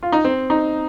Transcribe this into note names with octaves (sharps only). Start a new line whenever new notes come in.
F4
D#4
C4
D#4